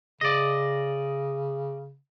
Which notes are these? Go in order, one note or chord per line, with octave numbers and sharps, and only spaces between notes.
C#3 D5 D#5